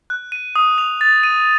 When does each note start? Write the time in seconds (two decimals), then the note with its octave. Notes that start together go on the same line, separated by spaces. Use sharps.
0.10 F#6
0.32 D#7
0.56 D#6
0.78 F7
1.01 A6
1.23 D#7